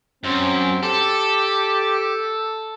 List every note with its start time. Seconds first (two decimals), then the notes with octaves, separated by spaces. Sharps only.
0.24 F#2 C4
0.83 G4 A4